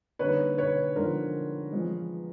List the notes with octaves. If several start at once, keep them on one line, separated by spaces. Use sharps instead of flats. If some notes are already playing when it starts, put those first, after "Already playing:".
D3 G3 A#3 D#4 B4 C#5
B4 C#5
D3 F3 G#3 B3 D#4 A#4 C5
F3 G#3 B3